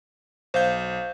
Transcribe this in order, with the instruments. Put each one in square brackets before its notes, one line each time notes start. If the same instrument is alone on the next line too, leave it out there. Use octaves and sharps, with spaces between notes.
[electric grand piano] B1 G6 [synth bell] C5 F5